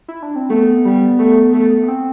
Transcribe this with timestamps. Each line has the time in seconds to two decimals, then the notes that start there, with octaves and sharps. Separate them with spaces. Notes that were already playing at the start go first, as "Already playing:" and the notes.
0.08 E4
0.23 D4
0.36 C4
0.50 A3 B3
0.85 G3
1.19 A3
1.53 A3
1.83 B3
1.88 C4